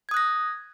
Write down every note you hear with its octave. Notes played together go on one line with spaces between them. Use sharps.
D#6 F#6 G#6 A#6